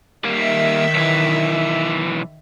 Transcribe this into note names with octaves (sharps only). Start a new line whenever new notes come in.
D#3 G3 A#3 E5
B1 E3